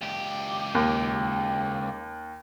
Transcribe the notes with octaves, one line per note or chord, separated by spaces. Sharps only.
C#2 G4
D#2